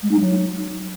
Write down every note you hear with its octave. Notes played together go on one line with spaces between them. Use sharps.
G#3
D#4
F#3